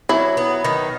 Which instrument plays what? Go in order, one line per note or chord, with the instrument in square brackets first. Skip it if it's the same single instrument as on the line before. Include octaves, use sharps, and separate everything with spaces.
[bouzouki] F#3 [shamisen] E4
[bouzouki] B3
D#3